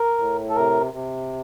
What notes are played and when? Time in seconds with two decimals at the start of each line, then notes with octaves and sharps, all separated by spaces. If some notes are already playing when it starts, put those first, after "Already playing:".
Already playing: A#4
0.18 A2
0.49 A4
0.55 C3 A#4
0.94 C3